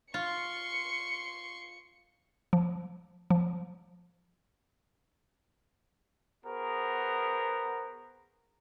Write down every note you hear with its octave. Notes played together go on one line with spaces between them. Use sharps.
F4 C6 C#6 C#7
F3
F3
B3 F#4 G#4 A#4 C5